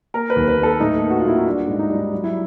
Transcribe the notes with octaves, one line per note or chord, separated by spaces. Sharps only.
A#3 A#4
B4
D#2
B4
A#3
A4
A2 D#4
A#3
F#4
F4
A2 E4
D#4
G3 D4
G#2
D#4
G3
D#4
F#3
E4